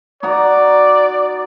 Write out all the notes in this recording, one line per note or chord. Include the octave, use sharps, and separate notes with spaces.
D#4 F#4 D5 A#5